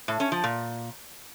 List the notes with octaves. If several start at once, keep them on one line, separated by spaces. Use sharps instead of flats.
A2
C#4
F3
A#2